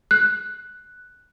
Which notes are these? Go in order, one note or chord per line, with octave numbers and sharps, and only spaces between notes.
F#6